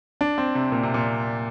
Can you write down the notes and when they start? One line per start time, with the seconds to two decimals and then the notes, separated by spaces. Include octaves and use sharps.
0.21 D4
0.38 C4
0.55 C3
0.72 A#2
0.83 C3
0.94 A#2